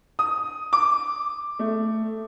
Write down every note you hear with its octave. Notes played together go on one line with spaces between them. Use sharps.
D#6
D6
A3